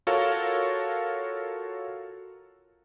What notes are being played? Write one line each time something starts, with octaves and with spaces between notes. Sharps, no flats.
F4 F#4 A4 A#4 C#5 F5